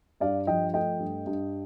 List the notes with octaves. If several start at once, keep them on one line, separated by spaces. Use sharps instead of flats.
G2 D5 F5
F3 D#5 G5
A3 D#5 G5
G2
G2